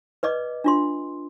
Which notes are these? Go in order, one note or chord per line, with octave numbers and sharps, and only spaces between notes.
B4 D5 D#5 D6
D4 F4 C6